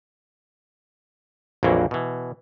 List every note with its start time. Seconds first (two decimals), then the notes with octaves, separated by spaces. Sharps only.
1.63 A#1 F2 A#2 E3 F#3 A#3
1.91 B2 E3